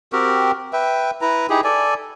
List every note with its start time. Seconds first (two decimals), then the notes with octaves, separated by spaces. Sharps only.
0.13 C4 F#4 G4 A#4
0.73 B4 E5 G5
1.21 E4 B4 A#5
1.50 D#4 E4 G4 G#4
1.64 A4 D5 G#5